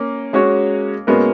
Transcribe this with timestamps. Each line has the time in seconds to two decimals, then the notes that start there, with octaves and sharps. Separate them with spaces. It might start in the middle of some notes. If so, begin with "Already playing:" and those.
Already playing: A#3 C#4
0.33 G#3 C#4 F#4 C#5
1.07 G#3 A#3 B3 C#4 F#4 A#4